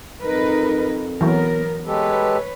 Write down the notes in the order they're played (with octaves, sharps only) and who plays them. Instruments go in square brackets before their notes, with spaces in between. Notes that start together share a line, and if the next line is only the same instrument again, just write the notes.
[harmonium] F2 [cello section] D#4 A#4 B4
[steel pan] E3 F#3 [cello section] B3 A#4
[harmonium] G#3 G4 A4 [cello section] B4 C#5